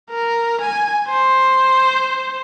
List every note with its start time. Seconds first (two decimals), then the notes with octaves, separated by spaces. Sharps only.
0.11 A#4
0.61 G#5
1.09 C5